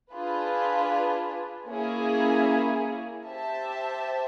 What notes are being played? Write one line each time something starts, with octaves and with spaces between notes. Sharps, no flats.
D4 F4 G#4 B4
A#3 C#4 E4 G#4
G4 C5 E5 A5